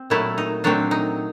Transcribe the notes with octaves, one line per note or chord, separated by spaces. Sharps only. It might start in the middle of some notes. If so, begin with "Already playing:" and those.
Already playing: C4
A#2 F#3 A3 E4
D#4
A#2 F#3 A3 C4 D4
D#4